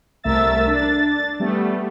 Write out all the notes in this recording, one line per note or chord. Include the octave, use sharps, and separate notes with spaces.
C2 A3 A#4 E5 E6 A6
D4 A6
G3 A3 B3